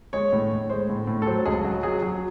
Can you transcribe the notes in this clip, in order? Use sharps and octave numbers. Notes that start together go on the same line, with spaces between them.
G#3 C#5
A2
A2
G#3 C5
A2
A2
A4
F#3 C5
C#2 G#4
F#3 F#4
F#3 G#4
F#3